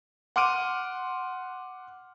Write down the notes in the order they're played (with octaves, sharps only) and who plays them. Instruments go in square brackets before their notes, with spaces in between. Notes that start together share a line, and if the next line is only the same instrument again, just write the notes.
[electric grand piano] F#5 C6 D6 F6 D7 D#7